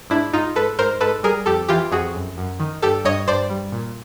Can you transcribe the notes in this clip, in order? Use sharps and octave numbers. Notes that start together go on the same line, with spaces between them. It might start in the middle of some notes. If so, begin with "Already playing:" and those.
G#2 D4 E4
G#2 D#4 F4
G#2 A4 B4
G#2 A#4 C5
G#2 A4 B4
G3 G#4 A#4
F2 G4 A4
E3 F4 G4
F2 F#4 G#4
F#2
F#2
D#3
G2 G4 A4
G2 C#5 D#5
G2 C5 D5
G3
A#2